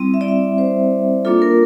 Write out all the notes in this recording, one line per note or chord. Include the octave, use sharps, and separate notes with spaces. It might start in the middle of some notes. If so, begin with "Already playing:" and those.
Already playing: G3 C4 E4
E5
D5
E5
C5
A#3 D4 F4 A4
A#4